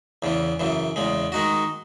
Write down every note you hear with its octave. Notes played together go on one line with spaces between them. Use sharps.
E2 C#3 E3
F#2 C#3 E3
E2 C#3 G#3
D#3 G#3 D#4 F#4